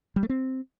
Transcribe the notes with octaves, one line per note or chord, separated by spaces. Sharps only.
G3
A3
C4